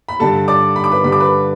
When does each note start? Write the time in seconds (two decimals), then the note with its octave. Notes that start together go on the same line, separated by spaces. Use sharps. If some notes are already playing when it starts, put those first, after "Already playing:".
0.09 B5
0.20 G2 D3 G3 A4 A5
0.48 D5 D6
0.76 B5
0.84 D6
0.91 B4 B5
1.04 G2 D3 G3 B5
1.12 D6
1.20 B4 B5